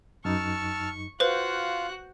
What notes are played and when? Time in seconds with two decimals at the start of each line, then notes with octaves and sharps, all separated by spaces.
0.25 F#2 D#4 A5 C#6 E6 F6
1.20 F4 F#4 B4 C5 F5 F#6 G6